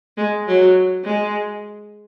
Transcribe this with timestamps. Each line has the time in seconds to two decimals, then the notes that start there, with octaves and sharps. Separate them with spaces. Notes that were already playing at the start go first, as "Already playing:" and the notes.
0.17 G#3
0.47 F#3
1.04 G#3